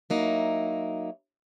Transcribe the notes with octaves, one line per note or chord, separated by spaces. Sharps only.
F#3 A#3 D#4 E4